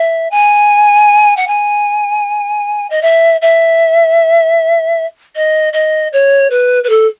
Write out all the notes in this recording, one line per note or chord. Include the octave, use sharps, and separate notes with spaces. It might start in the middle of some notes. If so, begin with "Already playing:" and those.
Already playing: E5
G#5
F#5
G#5
D#5
E5
E5
D#5
D#5
C#5
B4
B4
A4